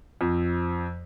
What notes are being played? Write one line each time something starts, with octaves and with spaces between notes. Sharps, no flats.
F2